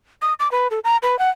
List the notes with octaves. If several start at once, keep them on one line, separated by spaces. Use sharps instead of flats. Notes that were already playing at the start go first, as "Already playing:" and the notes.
D#6
D6
B4
A4
A#5
B4
F#5